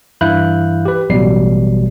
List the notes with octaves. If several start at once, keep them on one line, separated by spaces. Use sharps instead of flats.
G2 E3 E4 F5 F#6 G6
G4 B4
A1 B2 F#3 G3 C7